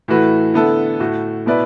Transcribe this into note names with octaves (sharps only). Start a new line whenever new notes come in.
A2 E3 A3 F#4 B4
D3 B3 E4 A4
A2 A3 F#4
B2 B3 E4 B4 D5